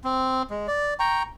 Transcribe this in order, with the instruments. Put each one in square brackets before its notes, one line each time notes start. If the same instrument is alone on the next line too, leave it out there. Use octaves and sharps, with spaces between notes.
[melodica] C4
G#3
D5
G5 A#5 C#6